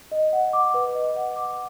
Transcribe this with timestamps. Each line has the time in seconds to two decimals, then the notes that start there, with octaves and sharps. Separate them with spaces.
0.12 D#5
0.33 F#5
0.53 D6
0.74 B4
0.95 D#5
1.16 F#5
1.36 D6